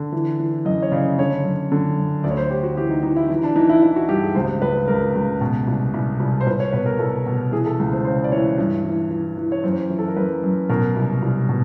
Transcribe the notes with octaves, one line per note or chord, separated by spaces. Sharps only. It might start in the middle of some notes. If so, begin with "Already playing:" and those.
Already playing: D3
E3
E3
F#2 D#5
C#5
C#3 D5
D3 C#5
F#2
D3
F#2
D2 D5
C#5
C5
D2 G4
F#4
E3 G4
D#4
E3 D#4
E4
E3 D#4
D4
E3 D#4
E4
E3 E4
F#4
G2 G4
G#4
C#2 C5
C#2 B4
C#2 A#4
C#2
B2
C2
C2
C2
C5
C2 B4
C#5
B2 B4
A#4
C2 A4
B2
E3 G#4
A4
C#2
C5
C#3 C5
D5
E3 C#5
G2
E3
E3
E3
C#5
F#2 C5
E3
A4
A#4
F#2 B4
F#2
B2 A#4
C2
C2
B2